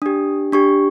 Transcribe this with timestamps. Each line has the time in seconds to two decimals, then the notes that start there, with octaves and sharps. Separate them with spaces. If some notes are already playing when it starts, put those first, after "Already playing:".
0.02 D4 G4 D#6
0.52 D4 G4 C#6